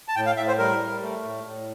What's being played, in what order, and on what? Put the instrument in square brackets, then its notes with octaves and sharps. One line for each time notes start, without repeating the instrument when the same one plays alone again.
[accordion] A5
A2 G5
F5
A2 E5
C5
G3 A#4
G3
A3
A2
A2